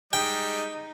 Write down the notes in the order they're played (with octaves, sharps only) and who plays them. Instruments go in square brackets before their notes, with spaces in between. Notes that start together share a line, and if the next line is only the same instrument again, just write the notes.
[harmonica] G3 G#3 D#5 [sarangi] D#4 [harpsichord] G5